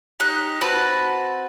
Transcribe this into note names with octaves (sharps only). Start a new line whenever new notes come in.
D#4 G4 F#6
C4 F#4 B4 A5